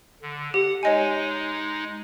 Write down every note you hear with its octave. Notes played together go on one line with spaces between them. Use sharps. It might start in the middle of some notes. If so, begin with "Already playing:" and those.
D3
G4 F#5
G#3 D#4 C#5 D#5 G#5